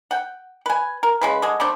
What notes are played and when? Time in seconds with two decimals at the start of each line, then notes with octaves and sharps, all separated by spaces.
0.11 F#5 G5
0.66 B4 G#5
1.03 A#4
1.21 C#3 G#3 B4
1.42 D3 G#3
1.60 G3 A3 C4 D4